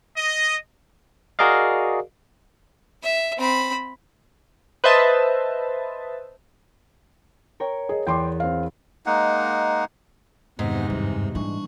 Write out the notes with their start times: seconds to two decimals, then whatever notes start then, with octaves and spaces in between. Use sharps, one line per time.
0.17 D#5
1.39 F#4 G#4 A#4 D5 D#5 F5
3.03 E5
3.38 C4 B5
4.84 B4 C5 D#5 E5 A5
7.60 A#4 C#5 G5
7.89 G#4 D#5
8.07 E2 G5 C6 D6
8.40 C4 F5
9.06 G#3 A#3 D#4 F#5
10.59 F2 G#2 C3 D#3 E3 B3 F#5
10.90 E2 G2
11.35 A#2 E3 G3 D4 C#6